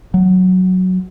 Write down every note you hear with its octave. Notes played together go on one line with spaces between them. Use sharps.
F#3